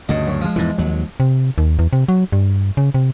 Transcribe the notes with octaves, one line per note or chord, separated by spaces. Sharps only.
D2 G2 C#3 D#5
F#2
F3 G#3
E2 G#2 E3
D#2 F#3
C3
D#2
E2
C3
F#3
G2
C#3
C3